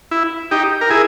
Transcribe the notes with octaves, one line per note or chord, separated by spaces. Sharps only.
E4
D#4 G4
A#4
E4 G#4